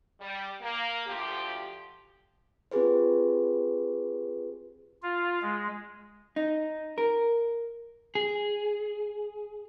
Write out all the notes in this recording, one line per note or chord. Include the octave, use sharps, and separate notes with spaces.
G3
A#3
D2 F3 G4
C4 F4 G4 G#4 B4 C5
F4
G#3
D#4
A#4
G#4